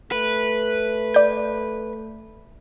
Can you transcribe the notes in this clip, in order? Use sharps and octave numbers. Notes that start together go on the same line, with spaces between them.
A3 B4
D5 G6